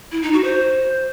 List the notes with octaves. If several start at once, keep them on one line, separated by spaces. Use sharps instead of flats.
E4
D#4
F#4
C5